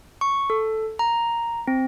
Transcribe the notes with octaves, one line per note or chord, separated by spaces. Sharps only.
C#6
A4
A#5
C4